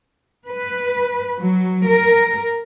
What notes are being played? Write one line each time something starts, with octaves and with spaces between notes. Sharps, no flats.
B4
F#3
A#4